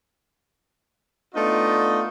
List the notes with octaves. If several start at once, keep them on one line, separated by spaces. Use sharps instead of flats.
A3 B3 D4 D#4 F4 D#5